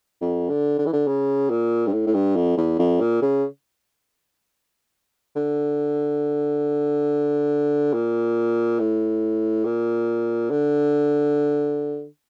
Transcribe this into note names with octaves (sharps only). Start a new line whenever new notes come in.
F2
D3
D3
E3
D3
C#3
A#2
G2
A2
A2
G2
F2
E2
F2
A#2
C#3
D3
A#2
A2
A#2
D3